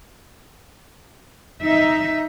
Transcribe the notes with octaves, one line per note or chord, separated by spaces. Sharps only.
D#4 E5